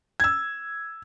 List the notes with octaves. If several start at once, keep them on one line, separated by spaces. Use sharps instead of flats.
E6 G#6